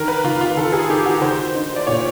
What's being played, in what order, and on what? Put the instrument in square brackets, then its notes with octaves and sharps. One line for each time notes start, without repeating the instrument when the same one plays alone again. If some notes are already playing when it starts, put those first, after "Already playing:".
Already playing: [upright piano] D#3 [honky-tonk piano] A#4
[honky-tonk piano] B4
[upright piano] D#3 [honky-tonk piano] F4
[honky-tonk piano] F4
[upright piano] D#3 [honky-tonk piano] A4
[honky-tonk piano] G#4
[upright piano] D#3 [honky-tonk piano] G4
[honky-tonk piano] F#4
[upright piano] D#3 [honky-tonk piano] C5
[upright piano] D#4
[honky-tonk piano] D5
[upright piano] A#2 [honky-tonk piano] C#5